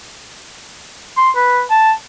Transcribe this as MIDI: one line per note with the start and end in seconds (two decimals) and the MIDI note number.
1.17 1.30 84
1.36 1.61 71
1.70 1.92 81